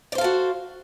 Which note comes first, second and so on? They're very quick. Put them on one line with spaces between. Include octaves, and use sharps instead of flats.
D5 C5 F5 A4 F#4